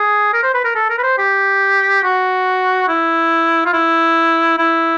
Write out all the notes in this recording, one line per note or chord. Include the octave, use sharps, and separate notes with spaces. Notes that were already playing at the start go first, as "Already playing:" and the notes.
Already playing: G#4
A#4
C5
B4
A#4
A4
A#4
B4
C5
G4
F#4
E4
F4
E4
E4